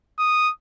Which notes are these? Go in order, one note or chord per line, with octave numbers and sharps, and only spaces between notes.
D#6